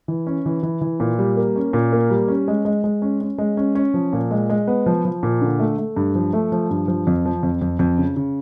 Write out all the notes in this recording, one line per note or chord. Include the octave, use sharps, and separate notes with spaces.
E3
C#4
E3
E3
E3
A#2
G3
A#3
C#4
A#2
A#3
G3
C#4
G#3
G#3
G#3
C#4
C#4
G#3
C#4
C#4
F3
A#2
G#3
G#3
B3
F3
F3
A#2
D3
A3
A3
G2
F3
A3
F3
G2
F3
F2
F3
F2
F2
F2
C#3
C#3